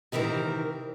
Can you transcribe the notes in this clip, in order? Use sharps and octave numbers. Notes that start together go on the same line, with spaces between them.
C3 D#3 E3 C4 A#4